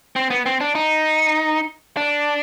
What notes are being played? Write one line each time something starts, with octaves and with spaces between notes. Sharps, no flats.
C4
B3
C4
D4
D#4
D4